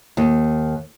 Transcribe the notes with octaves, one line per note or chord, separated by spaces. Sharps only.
D#2